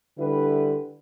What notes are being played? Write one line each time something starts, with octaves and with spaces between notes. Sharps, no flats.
D3 G3 E4 B4